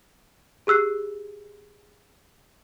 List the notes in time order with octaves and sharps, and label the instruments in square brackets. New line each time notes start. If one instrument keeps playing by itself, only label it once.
[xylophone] G4 G#4 E6 F#6 C7